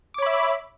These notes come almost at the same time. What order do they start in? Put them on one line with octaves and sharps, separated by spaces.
D6 C#5 B5 E5